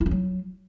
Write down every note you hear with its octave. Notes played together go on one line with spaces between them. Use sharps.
E4
C#4
F#3